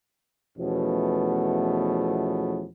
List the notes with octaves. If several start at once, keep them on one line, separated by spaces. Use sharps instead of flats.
E2 B2 F3 A3 B3 C#4